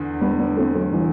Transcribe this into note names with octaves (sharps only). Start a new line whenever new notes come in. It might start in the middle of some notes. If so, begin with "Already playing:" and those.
Already playing: E2 D3
G3 B3
B3 D4
A3 C4
F#3 A3
E3 G3